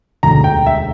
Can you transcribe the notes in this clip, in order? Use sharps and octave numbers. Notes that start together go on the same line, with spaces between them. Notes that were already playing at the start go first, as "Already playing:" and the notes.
E1 D2 D3 A#5
G5
E5